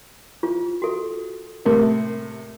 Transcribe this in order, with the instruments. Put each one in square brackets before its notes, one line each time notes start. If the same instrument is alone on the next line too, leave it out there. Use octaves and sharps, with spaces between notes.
[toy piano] F4
F#4 A4
[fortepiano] A2 C3 [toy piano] A#4